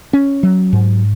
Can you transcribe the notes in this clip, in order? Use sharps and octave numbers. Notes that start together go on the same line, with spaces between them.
C#4
F#3
G#2